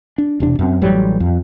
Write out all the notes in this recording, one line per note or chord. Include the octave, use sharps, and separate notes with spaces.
D4
E1 C3 D4
F#2 C4
A1 F#3 G3
F2